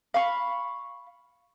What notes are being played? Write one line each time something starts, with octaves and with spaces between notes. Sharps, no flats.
F5 B5 C#6